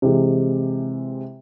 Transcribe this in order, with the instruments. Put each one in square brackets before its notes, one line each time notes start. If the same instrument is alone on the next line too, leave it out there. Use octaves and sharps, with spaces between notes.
[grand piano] C3 E3 G#3